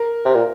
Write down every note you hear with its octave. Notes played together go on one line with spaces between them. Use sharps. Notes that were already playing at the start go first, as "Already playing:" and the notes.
Already playing: A#4
C3 A#4
A#2